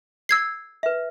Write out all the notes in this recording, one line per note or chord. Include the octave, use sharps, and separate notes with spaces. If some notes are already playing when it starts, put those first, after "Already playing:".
E6 G#6 C7
B4 E5